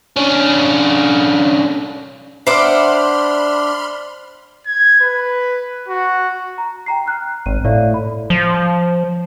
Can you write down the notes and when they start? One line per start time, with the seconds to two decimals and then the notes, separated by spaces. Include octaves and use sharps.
0.17 D3 C#4
2.47 D4 C5 E5 F#5 B5 C6 D6 F6
4.66 G#6
5.01 B4
5.89 F#4
6.58 A#5
6.86 G5 A#5 C7
7.06 A#5 F6 F#6
7.46 G#1 D#7
7.65 A2 D5 E5 F5
7.94 B5
8.30 F3